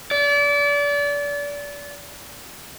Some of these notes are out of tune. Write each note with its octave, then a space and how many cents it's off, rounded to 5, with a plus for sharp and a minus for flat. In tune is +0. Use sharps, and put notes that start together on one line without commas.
D5 -30